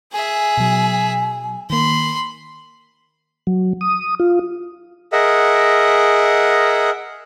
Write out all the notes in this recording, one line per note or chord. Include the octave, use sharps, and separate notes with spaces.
G#4 E5 G#5
B2 F#3
D#3 A#3 B5 C6
F#3
D#6
F4
G#4 A#4 D#5 E5 F#5